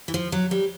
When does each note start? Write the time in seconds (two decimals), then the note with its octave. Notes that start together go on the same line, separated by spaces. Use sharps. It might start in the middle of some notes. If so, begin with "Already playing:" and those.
0.08 E3
0.14 F3
0.32 F#3
0.51 G3